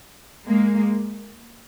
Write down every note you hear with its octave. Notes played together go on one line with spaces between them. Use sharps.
G#3 A#3